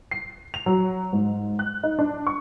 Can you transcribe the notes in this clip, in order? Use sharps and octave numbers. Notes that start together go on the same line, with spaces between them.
C7
F7
F#3
G#2
F#6
D#4
D4
C#6